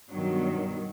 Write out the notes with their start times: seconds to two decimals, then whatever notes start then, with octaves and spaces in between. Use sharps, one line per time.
0.11 G2 B2 D#3 F#3